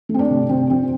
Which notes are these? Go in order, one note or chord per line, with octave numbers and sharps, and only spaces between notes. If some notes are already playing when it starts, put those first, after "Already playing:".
A3
C4
D4
C3
C3 C4
F3 C4